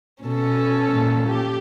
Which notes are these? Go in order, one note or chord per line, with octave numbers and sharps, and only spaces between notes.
B2 C#4 A4
A#2 E3
G4